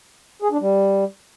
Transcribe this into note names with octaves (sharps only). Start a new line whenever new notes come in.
G#4
D4
G3